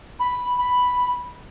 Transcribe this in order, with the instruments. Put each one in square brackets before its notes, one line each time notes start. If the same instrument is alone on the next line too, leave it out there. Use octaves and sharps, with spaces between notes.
[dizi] B5
B5